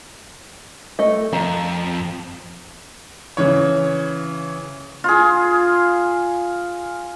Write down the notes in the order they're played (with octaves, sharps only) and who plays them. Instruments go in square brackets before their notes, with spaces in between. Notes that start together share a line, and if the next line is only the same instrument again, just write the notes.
[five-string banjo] A3 D#5
[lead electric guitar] F2 [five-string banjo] A#5
[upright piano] C#3 E3 C#5
[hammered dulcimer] F4 G#4